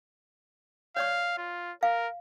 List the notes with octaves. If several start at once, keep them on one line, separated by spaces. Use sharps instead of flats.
C#5 D5 F5 C#6
F4
A#4 F5